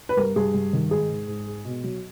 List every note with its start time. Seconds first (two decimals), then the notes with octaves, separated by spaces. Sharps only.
0.09 B4
0.17 G2 A#4
0.36 G2 G#4
0.54 G2
0.73 D#3
0.91 G#2 G#4
1.10 G#2
1.28 G#2
1.47 G#3
1.65 B2
1.84 F#3